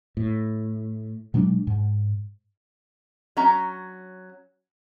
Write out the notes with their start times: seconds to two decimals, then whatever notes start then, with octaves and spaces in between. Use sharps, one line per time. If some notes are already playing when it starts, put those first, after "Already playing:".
0.17 A2
1.34 B2 F#3 G#3 D4
1.67 G#2
3.37 F#3 C#4 A#5